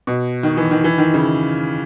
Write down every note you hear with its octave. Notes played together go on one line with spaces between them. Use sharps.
B2
D#3
E3
D#3
E3
D#3
C#3